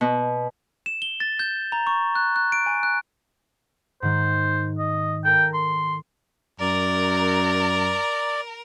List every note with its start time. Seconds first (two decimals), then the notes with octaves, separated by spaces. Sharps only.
0.01 B2
0.86 E7
1.02 G7
1.20 A6
1.39 G6
1.72 A#5
1.87 C#6
2.15 F#6
2.36 F#6
2.52 D7
2.66 G#5
2.83 F#6
4.02 G#2 D#3 C5 F#6
4.79 D#5
5.25 A4 A#4 G5
5.54 C6
6.60 F#2 A#4 D5 A#5